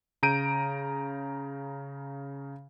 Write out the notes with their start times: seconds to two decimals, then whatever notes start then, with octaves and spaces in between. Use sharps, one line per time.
0.23 C#3 A#5 G6 D7 D#7